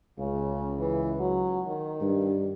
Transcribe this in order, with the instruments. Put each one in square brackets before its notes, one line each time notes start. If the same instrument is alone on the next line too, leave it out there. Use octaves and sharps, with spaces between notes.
[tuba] C#2 [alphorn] C#3
[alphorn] E3
F#3
D#3
[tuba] G2